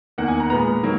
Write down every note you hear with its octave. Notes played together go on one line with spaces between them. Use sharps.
E2 D#3 A#3 F#5
G#5
A#5
A#2 G#3 B3 A#5
D#3 F#3 A#3